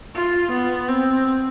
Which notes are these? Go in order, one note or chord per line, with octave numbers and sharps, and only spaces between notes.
F4
B3
C4